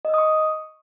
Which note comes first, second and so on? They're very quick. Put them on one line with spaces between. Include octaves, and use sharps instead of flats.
D#5 E6 D#6 C#6